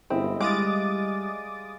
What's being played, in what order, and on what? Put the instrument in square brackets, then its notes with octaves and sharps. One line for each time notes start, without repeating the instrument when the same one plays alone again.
[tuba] G1 [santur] G#3 E4 D#5 [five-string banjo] C4
[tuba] G3 [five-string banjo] G#3 [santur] F5 G#5 [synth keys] D6 D#6 A6